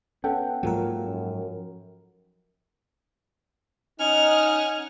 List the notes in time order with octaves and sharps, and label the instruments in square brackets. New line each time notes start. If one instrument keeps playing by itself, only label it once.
[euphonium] B3 [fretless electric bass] C#4 [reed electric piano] A4 F#5 G5
[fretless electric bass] G#2 F#3 [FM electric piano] F3 A#4 [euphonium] A#3
[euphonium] F#2
[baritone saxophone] C#4 [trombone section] D#4 [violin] F#5 F6